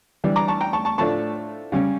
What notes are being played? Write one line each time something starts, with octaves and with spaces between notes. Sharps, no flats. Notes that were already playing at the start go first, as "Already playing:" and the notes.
E3 G3 D4
A#5 D6
A5 C#6
G5 A#5
A5 C#6
A5 C#6
A2 F3 A3 D4 A5 C#6
C#3 G3 C#4